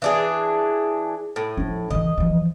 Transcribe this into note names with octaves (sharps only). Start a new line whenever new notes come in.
E3 D4 G#4
A2
F3 D4
D3 E3 D#5
E3 F3